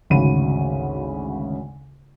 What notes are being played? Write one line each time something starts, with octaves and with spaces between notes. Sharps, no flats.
G#1 D2 C#3 F#4 B5 D#7